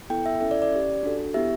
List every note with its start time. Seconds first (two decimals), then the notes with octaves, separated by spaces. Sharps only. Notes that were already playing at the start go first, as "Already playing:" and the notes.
0.10 B3 E4 A4 G5
0.26 E5
0.40 C#4 E4 A4 E5
0.51 D5
0.62 D5
0.71 C#4 G4
1.03 D4 F#4 A4
1.34 B3 E4 G4 E5